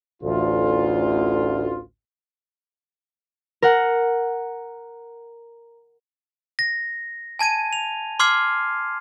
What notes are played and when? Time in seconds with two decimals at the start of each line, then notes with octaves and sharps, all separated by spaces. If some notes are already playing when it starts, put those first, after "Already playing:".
0.22 A1 D2 F4
3.62 A#4 F#5
6.59 A#6
7.39 G#5 A5 G#6 D#7
7.73 F7
8.20 C6 D6 F6 G#6 C7